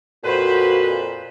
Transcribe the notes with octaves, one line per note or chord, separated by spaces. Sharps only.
F2 A#2 F#4 B4 C5